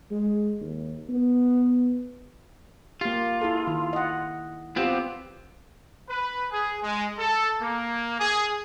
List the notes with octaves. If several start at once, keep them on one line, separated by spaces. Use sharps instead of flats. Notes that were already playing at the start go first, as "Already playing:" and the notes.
G#3
D#2
B3
A#3 F4 G4
E4 G#4 A4
D#3
D#5 F#5
B3 C4 F4 G4
B4
G#4
G#3
A4
A#3
G#4